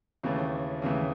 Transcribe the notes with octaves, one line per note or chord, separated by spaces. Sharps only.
D#2 C#3 E3 A3
D#2 C#3 E3 A3